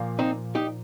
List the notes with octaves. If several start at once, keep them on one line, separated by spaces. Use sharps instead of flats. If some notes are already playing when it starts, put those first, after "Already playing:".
Already playing: A#2 F3 A#3
C4 D#4
D#4 G4